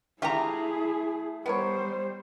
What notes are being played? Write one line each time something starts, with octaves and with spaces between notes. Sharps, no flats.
A3 E4 F4 G4 G#4 E5 A#5
G3 B3 A#4 C5 C#5